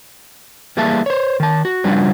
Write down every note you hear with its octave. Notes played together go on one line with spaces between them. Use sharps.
E3 G3 A#3 G#4 E5 A5
C5 C#5
D#3 A5
F#4
C#3 F3 G3 D4 F#4